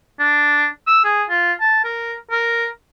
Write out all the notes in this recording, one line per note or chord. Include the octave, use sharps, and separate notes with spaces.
D4
E6
G#4
F4
A5
A#4
A#4